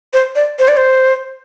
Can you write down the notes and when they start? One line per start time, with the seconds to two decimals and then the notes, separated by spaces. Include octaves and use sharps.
0.13 C5
0.36 D5
0.59 C5
0.68 D5
0.77 C5